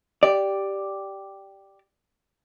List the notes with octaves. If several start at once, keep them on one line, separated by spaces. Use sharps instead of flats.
G4 D5